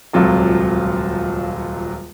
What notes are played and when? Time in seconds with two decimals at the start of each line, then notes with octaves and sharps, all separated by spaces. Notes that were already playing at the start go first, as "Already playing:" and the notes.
0.13 D#1 C#2 C3 F#3 F4 A4